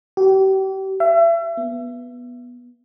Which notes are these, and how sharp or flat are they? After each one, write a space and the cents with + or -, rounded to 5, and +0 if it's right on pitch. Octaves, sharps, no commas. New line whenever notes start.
G4 -35
E5 +35
B3 -10